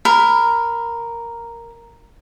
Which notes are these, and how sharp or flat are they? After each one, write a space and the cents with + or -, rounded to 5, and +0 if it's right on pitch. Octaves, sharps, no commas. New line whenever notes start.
A#4 +0 B5 +15